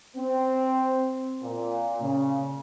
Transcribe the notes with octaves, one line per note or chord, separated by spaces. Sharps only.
C4
A#2
C#3